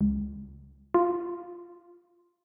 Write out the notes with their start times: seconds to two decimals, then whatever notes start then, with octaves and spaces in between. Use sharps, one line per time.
0.01 C#2
0.94 F4